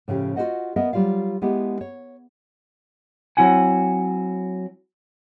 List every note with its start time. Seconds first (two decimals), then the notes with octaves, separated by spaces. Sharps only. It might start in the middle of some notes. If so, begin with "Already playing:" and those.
0.08 A2 C#3 F3 G4
0.36 F4 F#4 A#4 C5 D#5 F#5
0.76 B3 A#4 D#5 E5
0.93 F#3 G3 F4 D5 F5
1.42 G#3 B3 E4 G4
1.81 C#5
3.37 F#3 C4 E4 F#5 G#5